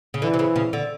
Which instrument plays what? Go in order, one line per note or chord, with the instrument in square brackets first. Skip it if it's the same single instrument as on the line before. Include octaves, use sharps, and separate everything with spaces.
[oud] C#3
[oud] D3 [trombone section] E3
[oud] C3
C#3
C#3
D3